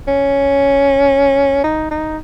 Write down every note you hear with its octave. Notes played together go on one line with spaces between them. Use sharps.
C#4
D#4
D#4